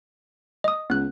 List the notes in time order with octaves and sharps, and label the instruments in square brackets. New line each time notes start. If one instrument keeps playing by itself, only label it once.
[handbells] D#5 D#6
[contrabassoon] C#2 [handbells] B3 F#6